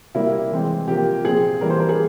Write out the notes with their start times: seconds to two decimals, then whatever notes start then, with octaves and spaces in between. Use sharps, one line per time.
0.15 C3 G3 A#3 E4
0.52 E3 G#3 C4
0.88 C3 F3 A#3 G4
1.24 A#2 F3 C4 G#4
1.61 E3 G3 A#3 A#4
1.70 C5
1.80 A#4
1.89 G#4